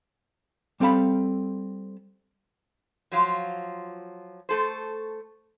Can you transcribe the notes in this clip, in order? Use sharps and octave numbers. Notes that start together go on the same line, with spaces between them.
G3 C4 A4 F5 B5
F3 F#3 F4
A3 A4 C5